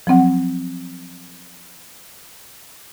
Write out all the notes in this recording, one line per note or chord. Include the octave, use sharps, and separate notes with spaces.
F3 F#3 C4 F#5